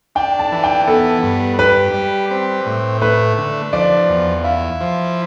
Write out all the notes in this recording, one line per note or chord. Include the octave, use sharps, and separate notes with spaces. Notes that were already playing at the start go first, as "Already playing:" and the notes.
D4 G5
A5
E3
G5
B3 A4
G2
G4 B4
G3
C4
A2
A3 B4
D3
F3 D5
E2
E4 F5
F3